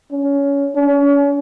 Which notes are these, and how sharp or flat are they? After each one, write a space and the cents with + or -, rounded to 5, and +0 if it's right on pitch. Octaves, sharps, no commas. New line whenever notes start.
C#4 +20
C#4 +35